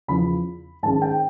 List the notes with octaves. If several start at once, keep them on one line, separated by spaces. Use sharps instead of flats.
E2 C#3 F3 B5
G#2 D#3 G#3 C#4 A5
G5